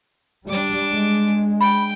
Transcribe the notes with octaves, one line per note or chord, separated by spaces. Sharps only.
G3 D4 D6
G#3
G5 B5